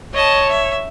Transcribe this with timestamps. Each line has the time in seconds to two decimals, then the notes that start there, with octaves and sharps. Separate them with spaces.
0.14 C#5 D#5 A5
0.49 E5